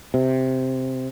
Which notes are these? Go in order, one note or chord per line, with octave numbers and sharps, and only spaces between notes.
C3